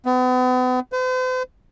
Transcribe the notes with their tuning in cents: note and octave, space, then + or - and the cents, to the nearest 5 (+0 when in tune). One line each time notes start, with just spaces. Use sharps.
B3 +40
C5 -45